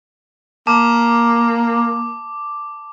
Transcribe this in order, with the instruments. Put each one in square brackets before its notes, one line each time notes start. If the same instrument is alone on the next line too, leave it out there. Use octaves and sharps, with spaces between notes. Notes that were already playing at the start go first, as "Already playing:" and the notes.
[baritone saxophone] A#3 [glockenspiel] A5 [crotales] D6